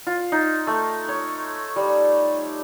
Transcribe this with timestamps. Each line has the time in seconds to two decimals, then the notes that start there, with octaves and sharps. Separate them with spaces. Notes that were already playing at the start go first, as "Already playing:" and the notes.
0.07 F4
0.32 D#4
0.67 A3
1.09 C#5
1.76 G3